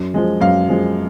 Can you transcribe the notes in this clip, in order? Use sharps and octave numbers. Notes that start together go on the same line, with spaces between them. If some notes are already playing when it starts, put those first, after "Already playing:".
Already playing: F#2
F3 G#3
F#2 F5
F3 G#3